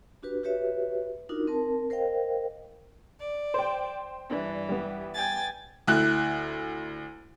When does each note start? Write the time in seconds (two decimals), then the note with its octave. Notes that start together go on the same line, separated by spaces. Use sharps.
0.23 D4 F#4 G4 B4
0.44 F#4 G4 B4 C#5 E5
1.29 D4 D#4 F4 F#4 A#4
1.47 C4 A#4 A5
1.90 A#4 C5 D#5 F5 G5
3.20 D5
3.54 C5 G5
4.31 G2 E3 D4
4.69 G3 B3
5.14 G5 G#5 A6
5.87 D2 E4 F#6